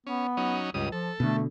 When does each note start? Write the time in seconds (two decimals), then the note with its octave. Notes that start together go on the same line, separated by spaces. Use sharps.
0.07 B3 C#4
0.37 F#3 C#4 D#4
0.74 C#2 G2 C#3 D#6
0.92 F3 A4
1.20 B2 D3 A3